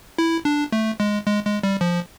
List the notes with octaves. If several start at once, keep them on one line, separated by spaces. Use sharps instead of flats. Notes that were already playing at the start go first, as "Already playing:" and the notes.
E4
D4
A3
G#3
G#3
G#3
G3
F3